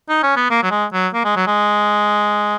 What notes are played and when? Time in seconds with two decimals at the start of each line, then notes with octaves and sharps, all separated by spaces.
0.09 D#4
0.23 C#4
0.36 B3
0.50 A#3
0.63 F#3
0.71 G#3
0.93 F#3
1.14 A#3
1.25 G#3
1.36 F#3
1.47 G#3